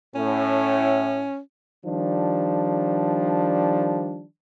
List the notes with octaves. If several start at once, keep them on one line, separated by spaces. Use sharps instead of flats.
A2 C#4
D#3 F3 G3 D4